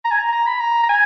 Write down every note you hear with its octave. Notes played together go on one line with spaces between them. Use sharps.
A#5
G#5
A#5
A#5
B5
A#5
A#5
G#5